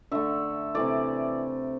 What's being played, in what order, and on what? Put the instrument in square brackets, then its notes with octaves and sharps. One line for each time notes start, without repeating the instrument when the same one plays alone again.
[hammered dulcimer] D3 A3 E5
C3 E3 A3 D5